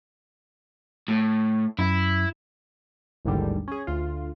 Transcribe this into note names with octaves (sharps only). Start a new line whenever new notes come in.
A2
F#2 E4
A1 D#2 G#2 D3 G3
C#4 G#4
D2 F4